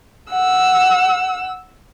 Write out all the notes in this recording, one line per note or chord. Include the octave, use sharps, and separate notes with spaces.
F#5 E6